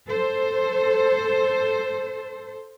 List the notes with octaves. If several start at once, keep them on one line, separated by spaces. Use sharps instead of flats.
A4 C5